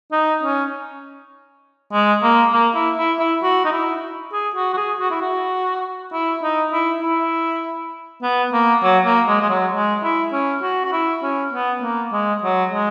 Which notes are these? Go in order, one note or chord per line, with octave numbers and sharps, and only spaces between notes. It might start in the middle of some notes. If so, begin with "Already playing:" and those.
D#4
C#4
G#3
A#3
A#3
E4
E4
E4
F#4
D#4
E4
G#4
F#4
F#4
G#4
F#4
E4
F#4
E4
D#4
E4
E4
B3
A#3
F#3
A#3
G#3
G#3
F#3
G#3
E4
C#4
F#4
F#4
E4
C#4
B3
A#3
G#3
F#3
G#3